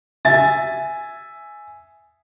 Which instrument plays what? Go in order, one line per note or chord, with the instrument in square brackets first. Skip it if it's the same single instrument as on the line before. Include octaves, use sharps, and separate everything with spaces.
[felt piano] E5 G#5 A6